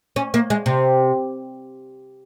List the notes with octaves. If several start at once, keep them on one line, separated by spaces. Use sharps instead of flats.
C#4
A#3
G#3
C3